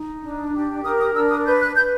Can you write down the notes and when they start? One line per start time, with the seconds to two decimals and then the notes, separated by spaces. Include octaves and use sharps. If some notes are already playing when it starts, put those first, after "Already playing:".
Already playing: D#4
0.23 D4
0.54 G4
0.84 A#4 D#6
0.99 D#6
1.15 D4 E6
1.30 D#6
1.45 B4 G6
1.60 F#6
1.76 B4 G6